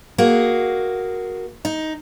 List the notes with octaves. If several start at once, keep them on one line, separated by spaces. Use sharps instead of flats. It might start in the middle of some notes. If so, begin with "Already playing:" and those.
A#3 F#4 G#4
D#4